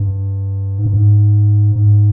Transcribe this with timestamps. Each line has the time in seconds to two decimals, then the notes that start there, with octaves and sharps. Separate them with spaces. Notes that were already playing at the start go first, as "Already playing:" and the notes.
Already playing: G2
0.78 G#2
0.86 G2
0.93 G#2
1.75 G#2